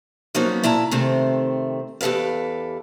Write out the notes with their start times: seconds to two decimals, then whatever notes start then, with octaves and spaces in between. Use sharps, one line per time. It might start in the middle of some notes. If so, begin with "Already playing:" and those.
0.35 F3 F#3 A#3 B3 C#4 D#4
0.63 A#2 E4 A5 A#5
0.91 C3 D#3 A3 C4
2.01 E2 G4 A4 B4 F5